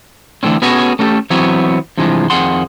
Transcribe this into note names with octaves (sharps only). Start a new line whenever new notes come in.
D3 E3 A3 C4 C#4
B3 C#4 F#4 G#4 A4 C#5
A3 C#4 D#4 F#4 G4 A4
E3 F#3 B3 C4 C#5
G2 C3 E3 F3 G#3
F2 D#3 G#4 F#5 C6